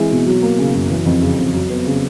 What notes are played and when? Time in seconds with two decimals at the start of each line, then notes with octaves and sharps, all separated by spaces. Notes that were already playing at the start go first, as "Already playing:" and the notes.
Already playing: E3 G#3 C4 E4
0.11 B2
0.27 F#3
0.42 A#3
0.58 C#3
0.74 F#2
0.90 E3
1.06 F2
1.22 C#3
1.38 F2
1.53 F#3
1.70 B3
1.86 C#3